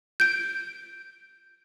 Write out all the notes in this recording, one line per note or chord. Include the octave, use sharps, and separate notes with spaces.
G6 D7